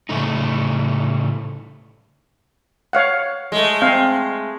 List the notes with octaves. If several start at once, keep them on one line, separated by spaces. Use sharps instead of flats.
A2 C#3 A3 D#4
C#5 F5 F#5
G#3 A3
C4 F5